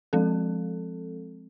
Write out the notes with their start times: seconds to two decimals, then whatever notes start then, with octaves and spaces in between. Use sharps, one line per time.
0.13 F3 G#3 C4 A4